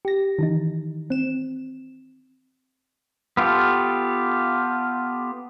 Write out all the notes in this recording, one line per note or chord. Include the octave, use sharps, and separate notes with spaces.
G4 A#6
D#3 E3 D#4
C4 E7
B3 F4 G4 A4